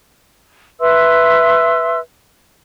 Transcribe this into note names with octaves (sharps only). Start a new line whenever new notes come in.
B4 E5 C6 E6